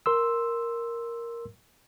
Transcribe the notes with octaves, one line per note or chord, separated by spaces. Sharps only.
A#4 C6 E6